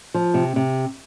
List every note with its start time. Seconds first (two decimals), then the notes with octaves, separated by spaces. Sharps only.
0.14 F3
0.34 C3
0.56 C3